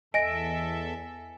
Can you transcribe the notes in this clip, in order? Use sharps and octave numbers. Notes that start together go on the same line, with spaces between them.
E2 A4 D#5 E5 G#5 A#6 D7